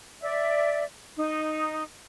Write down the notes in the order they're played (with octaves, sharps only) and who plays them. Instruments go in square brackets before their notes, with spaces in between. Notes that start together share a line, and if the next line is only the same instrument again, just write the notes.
[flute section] D5 E5
D#4